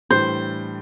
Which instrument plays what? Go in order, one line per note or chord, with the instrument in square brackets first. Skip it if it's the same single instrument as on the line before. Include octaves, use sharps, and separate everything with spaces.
[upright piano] A2 E3 G3 D4 [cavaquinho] C5